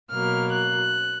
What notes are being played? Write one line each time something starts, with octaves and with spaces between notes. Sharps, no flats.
B2 F#3 A#3 F6
F#6